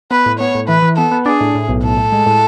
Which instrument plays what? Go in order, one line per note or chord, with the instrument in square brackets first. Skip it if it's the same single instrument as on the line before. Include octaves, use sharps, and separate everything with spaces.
[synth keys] B3 [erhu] B4
[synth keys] A2
[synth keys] B3 [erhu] C#5
[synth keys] A2
[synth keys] E3 [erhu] B4
[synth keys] E3
[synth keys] B3 [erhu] A4
[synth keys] B3
[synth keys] D4 [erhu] G#4
[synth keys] A2
A2
B1
[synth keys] A2 [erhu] A4
[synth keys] A2
G#3
A2